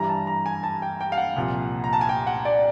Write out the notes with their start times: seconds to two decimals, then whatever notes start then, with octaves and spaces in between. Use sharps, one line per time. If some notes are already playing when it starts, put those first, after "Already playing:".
Already playing: G2 E3 G3 A#5
0.09 A5
0.27 A#5
0.46 G#5
0.63 A5
0.82 G5
1.01 G5
1.12 F5
1.18 F#5
1.36 C2 A#2 F3
1.84 A#5
1.93 A5
2.01 G#5
2.09 G5
2.27 F#5
2.45 D5